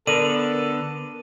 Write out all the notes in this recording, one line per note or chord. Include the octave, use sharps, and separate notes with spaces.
D3 B3 A4 A#4 D5 D#7